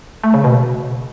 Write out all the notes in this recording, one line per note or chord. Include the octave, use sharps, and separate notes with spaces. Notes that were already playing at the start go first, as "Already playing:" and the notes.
A3
C#3
B2